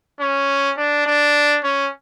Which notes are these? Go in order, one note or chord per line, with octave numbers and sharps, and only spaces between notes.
C#4
D4
D4
C#4